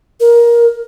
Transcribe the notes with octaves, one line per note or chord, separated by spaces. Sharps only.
A#4